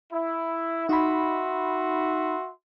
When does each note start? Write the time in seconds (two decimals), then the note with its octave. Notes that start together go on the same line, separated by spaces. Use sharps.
0.12 E4
0.89 D#4 F#4 E5 B5 C6